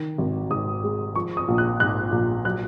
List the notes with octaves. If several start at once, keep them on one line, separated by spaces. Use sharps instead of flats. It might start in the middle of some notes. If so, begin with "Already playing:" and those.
Already playing: D#3
G#1
G#2 D#6
G#3
F3 C#6
D#6
A#1
F#6
G#2 F#6
A#1
F#3 F#6